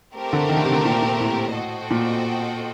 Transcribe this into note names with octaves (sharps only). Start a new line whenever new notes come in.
A3 C4 G4 A#4
D3
D#3
D3
C3
D3
A#2
A#2
A2
F#4 A4 C5 D#5 G5
A#2